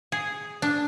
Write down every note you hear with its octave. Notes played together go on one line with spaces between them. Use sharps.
G#4
D4